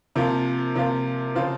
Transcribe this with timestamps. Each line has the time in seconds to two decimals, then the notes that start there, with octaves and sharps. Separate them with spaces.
0.16 C3 F3 A#3 F4
0.75 C3 F3 A#3 F4
1.35 C#3 F3 C4 F4